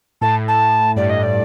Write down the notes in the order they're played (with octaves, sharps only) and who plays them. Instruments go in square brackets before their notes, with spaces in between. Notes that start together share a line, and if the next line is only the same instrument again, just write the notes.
[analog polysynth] A2 [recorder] A5
[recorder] A5
[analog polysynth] G2 [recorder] D5
[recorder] D#5
D5